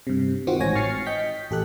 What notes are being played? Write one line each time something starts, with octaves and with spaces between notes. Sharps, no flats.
G2 C3
D#3 C4 F4 F#4
A1 G#2 C#5 G#5 A#6
C#6 F6 A6 C7 C#7
D#5 G5 G6 B6
A1 G4 A4 F#6